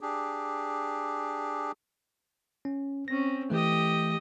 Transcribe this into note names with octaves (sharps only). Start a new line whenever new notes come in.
D4 G4 G#4
C#4
C4 C#4 A#6
E3 A3 G4 D#5